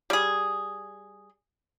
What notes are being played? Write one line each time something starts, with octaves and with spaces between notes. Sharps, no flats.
G3 G#4